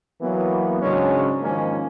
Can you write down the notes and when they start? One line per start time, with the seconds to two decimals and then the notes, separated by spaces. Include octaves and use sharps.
0.21 E3 F#3 A#3 B3
0.82 G#2 C#3 F#3 G#3 C#4 D4
1.43 G#2 D#3 F3 G#3 A#3 C#4